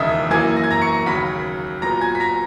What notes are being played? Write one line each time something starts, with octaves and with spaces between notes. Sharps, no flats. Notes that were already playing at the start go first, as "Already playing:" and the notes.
Already playing: E1 D#2 C#3 D#5 E5 D#6 E6
F#2 E3 A#3 G#5 G#6
A#6
G#6
A#5 A#6
C#6 C#7
D#2 C#3 F#3 B5 B6
A#2 F#3 B3 A#5 A#6
G#5 G#6
B6
A#5 A#6